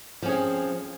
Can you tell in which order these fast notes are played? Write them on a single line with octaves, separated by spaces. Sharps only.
F3 C#4 G#4 C4